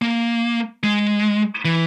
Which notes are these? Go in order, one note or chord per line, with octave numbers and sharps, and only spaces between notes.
A#3
G#3
E3